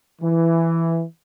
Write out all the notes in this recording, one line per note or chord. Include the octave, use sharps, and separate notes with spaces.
E3